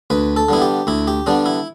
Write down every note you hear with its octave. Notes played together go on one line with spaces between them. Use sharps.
D2 B4
A4
D3 G3 B3 E4
G4
D2 E4
G4
D3 G3 B3 D4
E4